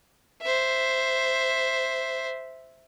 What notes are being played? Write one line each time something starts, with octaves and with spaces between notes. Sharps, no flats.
C5 E5